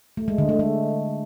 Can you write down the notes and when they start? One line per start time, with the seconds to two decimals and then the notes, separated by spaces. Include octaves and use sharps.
0.17 A3
0.28 G#3
0.38 D3
0.49 A3
0.59 G#3